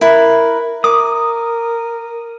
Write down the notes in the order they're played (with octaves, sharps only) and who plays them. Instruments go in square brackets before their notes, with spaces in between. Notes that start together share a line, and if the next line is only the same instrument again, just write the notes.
[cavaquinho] E4 B4 [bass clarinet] A#4
[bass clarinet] A#4 [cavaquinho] D6 [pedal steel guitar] D#6